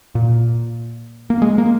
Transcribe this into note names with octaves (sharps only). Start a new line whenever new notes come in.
A#2
A#3
G#3
A#3